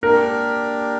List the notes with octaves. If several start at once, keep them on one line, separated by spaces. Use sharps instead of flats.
A#3 D4 G4 A#4